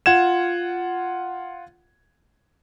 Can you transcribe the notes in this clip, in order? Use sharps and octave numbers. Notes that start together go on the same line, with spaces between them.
F4 F#5 G#6 E7